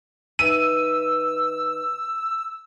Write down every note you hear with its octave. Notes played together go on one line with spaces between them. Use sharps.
D#3 B4 E5 E6 D#7